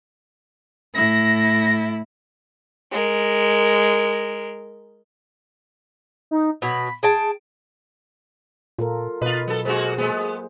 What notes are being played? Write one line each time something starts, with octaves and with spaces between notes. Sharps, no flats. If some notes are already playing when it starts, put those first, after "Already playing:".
A2 E4 A#6
G#3 A#4
D#4
B2 F#3 B5
G#4 G5 A5 D7
A#2 F4 A4 A#4
B2 F4 B4 D#5
F#3 B3 A4
G#3 A#3 F#4 A4 C5
G#3 A#3 B3 G#4 C5